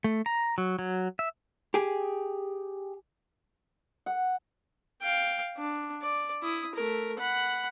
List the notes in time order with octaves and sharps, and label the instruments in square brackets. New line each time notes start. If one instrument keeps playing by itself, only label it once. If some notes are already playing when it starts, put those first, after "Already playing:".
[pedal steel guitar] A3
A#5
F#3
F#3
E5
[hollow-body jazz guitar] G4 G#4
[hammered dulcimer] F#5
[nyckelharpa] F5 G5
D4
D5
E4 D#6
A3 A#4
F#5 B5